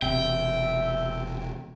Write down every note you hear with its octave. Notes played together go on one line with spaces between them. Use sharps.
E1 C3 E5 G5